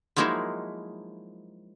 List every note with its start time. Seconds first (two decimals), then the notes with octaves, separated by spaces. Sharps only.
0.16 F3 F#3 G#3 A#3 D#4 E4